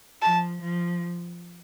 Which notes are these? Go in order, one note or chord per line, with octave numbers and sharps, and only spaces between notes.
F3 A5
F3